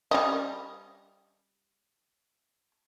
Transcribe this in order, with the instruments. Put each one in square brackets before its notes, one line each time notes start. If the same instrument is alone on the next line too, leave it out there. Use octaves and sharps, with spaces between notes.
[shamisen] G3 C#4 D#5